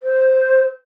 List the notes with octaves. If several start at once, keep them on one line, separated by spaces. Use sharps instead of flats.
C5